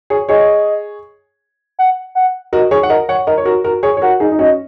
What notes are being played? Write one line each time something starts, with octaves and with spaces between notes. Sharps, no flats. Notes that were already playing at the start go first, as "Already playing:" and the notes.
G#4 C#5
G#4 C#5 D#5
F#5
F#5
F#4 A#4 D#5
G#4 C#5
F#5
A#4 D#5
C#5 F#5
A#4 D#5
C#5
F#4 A#4
F#4 A#4
G#4 C#5
C#5
F#4 A#4 F#5
D#4 G#4
D#4
C#4 F#4 D#5